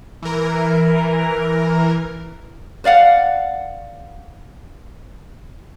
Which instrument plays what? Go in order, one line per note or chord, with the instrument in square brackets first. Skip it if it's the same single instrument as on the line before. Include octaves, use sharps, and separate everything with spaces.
[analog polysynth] E3 A#4
[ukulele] B4 D5 F5 F#5